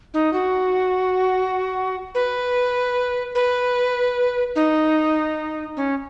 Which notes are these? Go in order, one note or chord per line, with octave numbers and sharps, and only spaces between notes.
D#4
F#4
B4
B4
D#4
C#4